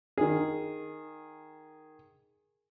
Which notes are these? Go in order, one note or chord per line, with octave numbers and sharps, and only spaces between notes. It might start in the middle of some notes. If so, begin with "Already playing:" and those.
D#3 G#4